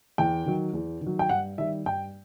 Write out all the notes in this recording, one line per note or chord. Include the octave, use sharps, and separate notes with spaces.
E2 G5
D#3 F#3
E2
D#3
F#3
G5
G2 F#5
D#3 G3 E5
G2 G5